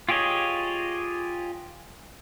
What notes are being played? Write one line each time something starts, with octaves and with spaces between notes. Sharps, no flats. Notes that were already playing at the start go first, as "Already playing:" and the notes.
F4 G4 G#4 C#5 D#5